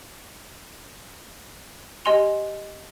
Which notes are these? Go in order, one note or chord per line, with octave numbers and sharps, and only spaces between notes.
G4 D#5 G#5 C6 F7